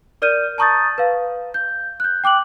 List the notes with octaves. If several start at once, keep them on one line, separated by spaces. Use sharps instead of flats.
A#4 D5 F6 G6 D#7
A5 A#5 C#6 D#6 G6 A6
B4 F5
G6
F#6 G6
G5 D6 F#6 F#7